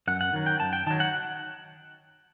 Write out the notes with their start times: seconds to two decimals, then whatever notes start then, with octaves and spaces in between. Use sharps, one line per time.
0.07 F#2 F#5
0.21 F#5
0.33 D#3 F#3
0.46 G5
0.60 F#2 A5
0.73 G5
0.86 D#3 F#3 A5
1.00 F#5